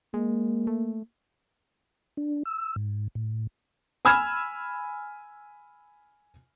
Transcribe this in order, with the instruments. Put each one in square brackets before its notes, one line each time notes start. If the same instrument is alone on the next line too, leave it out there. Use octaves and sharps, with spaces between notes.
[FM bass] G#3 [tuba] A#3
[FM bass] A3
[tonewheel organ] D4
E6
G#2
A2
[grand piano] G#5 B5 E6 F6 G#6 E7